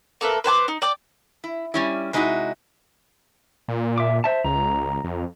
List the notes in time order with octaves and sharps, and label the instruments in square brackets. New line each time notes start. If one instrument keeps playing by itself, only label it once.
[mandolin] A#3 A4 B4 E5
B4 C5 G#5 D6
D#4
D5 G5 D6
[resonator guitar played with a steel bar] E4
G3 C#4 E4
C3 G#3 D#4 E4 F#4
[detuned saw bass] A#2
[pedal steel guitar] E5 D6
C5 E5 A5
[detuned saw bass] C#2 [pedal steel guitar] A#5
[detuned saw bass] F2